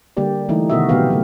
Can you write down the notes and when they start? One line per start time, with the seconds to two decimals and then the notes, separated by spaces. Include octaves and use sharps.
0.17 D3 G3 A#3 G4 D5
0.49 E3 G3 A3 D#4
0.70 C3 D#3 B3 F#4 D#5 E5
0.89 A#2 C#3 F#3 B3 G4 F5
1.10 F#3 A3